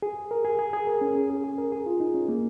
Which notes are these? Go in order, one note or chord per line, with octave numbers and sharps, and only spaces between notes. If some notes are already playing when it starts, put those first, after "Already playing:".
G#4
A#4
G#4
G#4
G#4
A#4
C#4
C#4
G#4
G#4
A#4
G#4
F4
D#4
C#4
A#3